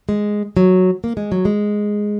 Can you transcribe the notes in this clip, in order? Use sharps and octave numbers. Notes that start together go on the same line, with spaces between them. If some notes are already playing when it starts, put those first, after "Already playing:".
G#3
F#3
A#3
G#3
F#3
G#3